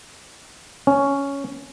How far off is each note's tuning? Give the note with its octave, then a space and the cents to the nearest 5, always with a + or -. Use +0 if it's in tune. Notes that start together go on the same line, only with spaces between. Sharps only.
C#4 +5